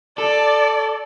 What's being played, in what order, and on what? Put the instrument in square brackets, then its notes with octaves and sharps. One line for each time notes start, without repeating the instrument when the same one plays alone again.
[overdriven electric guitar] A4 [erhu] D5